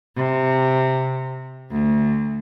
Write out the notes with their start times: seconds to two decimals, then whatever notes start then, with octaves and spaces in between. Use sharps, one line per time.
0.16 C3
1.70 D2